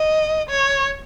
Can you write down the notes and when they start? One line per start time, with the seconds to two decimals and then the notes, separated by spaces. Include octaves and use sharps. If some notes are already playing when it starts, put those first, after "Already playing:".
Already playing: D#5
0.49 C#5